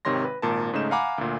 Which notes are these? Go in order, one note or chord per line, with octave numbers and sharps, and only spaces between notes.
G#1 C3 D#3 C#5 C6 A#6
B4
G#1 A#2 A#4 A5
G#2 C#3 A3 D#4 G6 E7
F5 F#5 G#5 A#5 B5 D6
D2 A#2